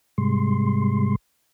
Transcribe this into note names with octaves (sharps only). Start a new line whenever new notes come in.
G#2 C3 G3 G#3 C6